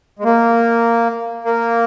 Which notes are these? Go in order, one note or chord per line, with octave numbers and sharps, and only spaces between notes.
G#3
A#3
A#3